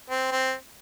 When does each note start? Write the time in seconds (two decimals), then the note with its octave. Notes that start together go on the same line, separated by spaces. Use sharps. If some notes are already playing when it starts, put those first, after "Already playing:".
0.10 C4
0.31 C4